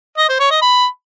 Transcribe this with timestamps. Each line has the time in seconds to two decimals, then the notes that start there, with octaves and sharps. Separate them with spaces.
0.18 D#5
0.29 C5
0.40 C#5
0.51 D#5
0.62 B5